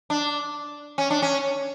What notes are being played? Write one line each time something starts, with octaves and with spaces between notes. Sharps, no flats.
D4
C#4
D4
C#4